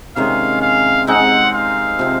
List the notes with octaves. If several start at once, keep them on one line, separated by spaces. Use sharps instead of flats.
C3 D#3 G#3 C#4 F5
F5
G#3 C4 D#4 F#5
F5
C3 F3 C4